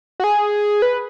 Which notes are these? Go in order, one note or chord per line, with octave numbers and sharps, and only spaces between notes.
F#4
G#4
B4